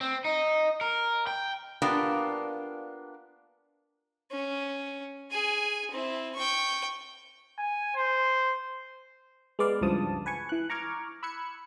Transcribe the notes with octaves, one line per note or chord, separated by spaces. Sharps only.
C4
D#4
A#4
G5
A#3 B3 D4 F4 G4
C#4
G#4 G#5
C4 E4
G5 C#6
G#5
C5
G#3 B3 D5 F5
C#2 G2 E3 F3 A5 D#6
B4 G#5 C#6
E3 F#6
A#5 C#6 D6 F6 G#6
B5 E6 F#6 G#6 C#7